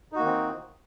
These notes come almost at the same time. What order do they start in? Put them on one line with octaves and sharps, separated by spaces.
D#4 F#4 A#3 D#3 C4